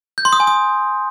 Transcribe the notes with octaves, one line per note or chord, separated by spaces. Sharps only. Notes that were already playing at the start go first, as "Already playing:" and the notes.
G6
C6
D#6
G#5
D#6